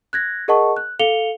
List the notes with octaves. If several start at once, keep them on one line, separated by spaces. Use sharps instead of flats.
F#6 G#6 A#6
G#4 A#4 D#5 F#5 A5 C#6
F#6
A4 F5 C#7 F7 G7